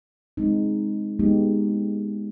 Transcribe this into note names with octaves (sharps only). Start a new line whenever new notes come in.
G#3 C4 D#4
G#3 B3 D#4 G4